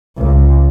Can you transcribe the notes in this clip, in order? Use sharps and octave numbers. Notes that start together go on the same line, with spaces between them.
C#2